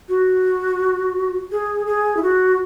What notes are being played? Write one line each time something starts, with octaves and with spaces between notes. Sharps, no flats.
F#4
G#4
G#4
E4
F#4